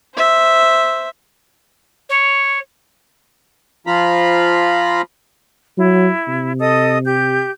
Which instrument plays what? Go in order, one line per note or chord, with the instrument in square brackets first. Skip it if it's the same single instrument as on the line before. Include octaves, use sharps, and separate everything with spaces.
[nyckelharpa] C5 E5
[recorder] C#5
[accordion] F3 F4 A#5 B5
[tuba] F#3 [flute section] E4
[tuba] C3
[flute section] A4 D#5 D#6
G4 G6